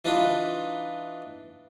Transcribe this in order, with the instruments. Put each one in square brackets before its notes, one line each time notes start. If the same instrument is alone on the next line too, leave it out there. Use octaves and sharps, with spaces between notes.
[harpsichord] E3 D4 D#4 F4 B4